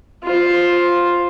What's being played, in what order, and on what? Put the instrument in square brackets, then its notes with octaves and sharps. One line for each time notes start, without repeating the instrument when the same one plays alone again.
[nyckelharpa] F4 C5